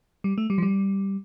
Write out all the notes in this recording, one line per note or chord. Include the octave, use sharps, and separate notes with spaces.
G3
A3
G3
F3
G3